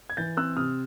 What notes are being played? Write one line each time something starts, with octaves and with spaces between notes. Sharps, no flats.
G#6
E3 G6 A6
C4 E6 F#6
C3 D#6 F6